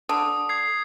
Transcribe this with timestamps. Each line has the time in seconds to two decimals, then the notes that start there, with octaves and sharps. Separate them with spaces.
0.09 D3 D#6
0.49 D#6 G#6 C7